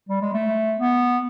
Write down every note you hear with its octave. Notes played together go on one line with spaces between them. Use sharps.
G3
G#3
A3
B3